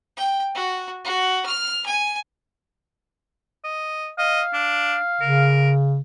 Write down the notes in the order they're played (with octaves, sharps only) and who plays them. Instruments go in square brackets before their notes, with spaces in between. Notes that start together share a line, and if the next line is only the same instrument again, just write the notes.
[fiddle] G5
F#4
F#4
F6
G#5
[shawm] D#5
[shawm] D#5 [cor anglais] F5
[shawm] D4
[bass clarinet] C#3 [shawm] A#4